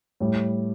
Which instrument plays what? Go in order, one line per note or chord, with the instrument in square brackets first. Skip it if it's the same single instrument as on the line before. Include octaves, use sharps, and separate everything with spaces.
[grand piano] A2 G3